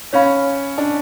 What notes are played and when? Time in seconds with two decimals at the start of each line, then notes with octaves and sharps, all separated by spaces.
0.13 C#4 C#5 F5 B5
0.78 D4